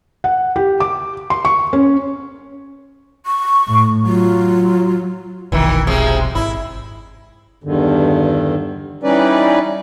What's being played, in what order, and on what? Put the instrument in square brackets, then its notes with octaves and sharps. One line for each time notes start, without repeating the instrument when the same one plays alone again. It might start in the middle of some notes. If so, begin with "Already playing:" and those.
[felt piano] F#5
G4
D6
C6
C#6
C#4
[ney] C#6
[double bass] A2
[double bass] F#3 [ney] F4
[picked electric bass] F1 B1 [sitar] D#3 E3
[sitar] C3 F3 G#3
[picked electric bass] G#1 [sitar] E4
[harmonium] E2 G2 D3 D#3
E3 G3 C#4 D#4 B4 D5